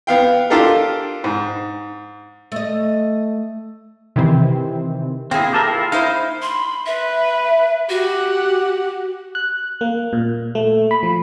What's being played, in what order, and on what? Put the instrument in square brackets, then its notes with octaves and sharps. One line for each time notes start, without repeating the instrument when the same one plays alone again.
[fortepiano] B3 F5 G5
D4 F4 G4 A4 A#4
G#2
[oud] A3 D#5
[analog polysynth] C3 D#3 E3 C4
[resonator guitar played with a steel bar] A#3 G#4 [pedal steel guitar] C4 E4
[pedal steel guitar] G4 A4 A#4
E4 F4
[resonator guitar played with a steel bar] D#4 E4 C5 [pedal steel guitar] F5
[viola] B5 [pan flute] C6
[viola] B4 [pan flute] E5
[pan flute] F#4 [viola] G4 F#5
[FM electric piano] F#6
A#3
A#2
A3
B5
F3